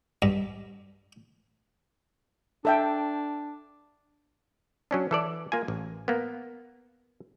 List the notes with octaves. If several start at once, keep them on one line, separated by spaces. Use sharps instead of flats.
G2
D4 A4 E5 G5
F#3 C#4 D4
E3 A4 D5
A#3 F4 G#5
A1
A#3 B3